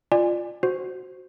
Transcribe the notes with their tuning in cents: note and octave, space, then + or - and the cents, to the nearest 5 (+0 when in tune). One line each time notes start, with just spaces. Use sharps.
F4 +0 D5 +25 G#5 -15
F#4 +0 C5 +0